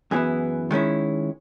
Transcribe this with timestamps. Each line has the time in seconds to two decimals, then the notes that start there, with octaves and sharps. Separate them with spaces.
0.11 F#2 E3 B3 E4 G#4
0.71 D#3 G#3 C#4 E4